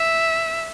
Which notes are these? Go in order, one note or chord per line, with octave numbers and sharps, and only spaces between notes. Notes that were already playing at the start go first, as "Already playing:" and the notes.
Already playing: E5